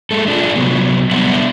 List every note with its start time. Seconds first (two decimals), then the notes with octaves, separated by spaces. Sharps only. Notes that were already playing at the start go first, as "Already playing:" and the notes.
0.11 G#3 A3 A4
0.28 D4 F4 G#4
0.56 C3 F#3 B3
1.11 G3 B3 D4 E5 F#5